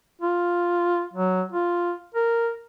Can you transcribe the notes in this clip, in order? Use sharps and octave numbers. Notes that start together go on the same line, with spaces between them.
F4
F#3
F4
A#4